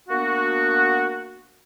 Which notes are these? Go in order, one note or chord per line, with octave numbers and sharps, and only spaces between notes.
A#3 B3 D4 F#4